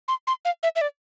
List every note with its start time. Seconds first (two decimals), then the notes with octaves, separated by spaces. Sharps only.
0.08 C6
0.27 C6
0.45 F5
0.63 E5
0.76 E5
0.81 D5